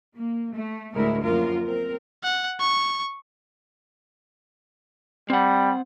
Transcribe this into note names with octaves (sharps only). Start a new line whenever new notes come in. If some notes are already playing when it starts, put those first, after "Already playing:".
A#3
A3
D2 A2 G#3 A3 E4 A#4
F#2 F3 A#3 F4 A#4
C4 A#4
F#5
C#6
G3 C4 F#5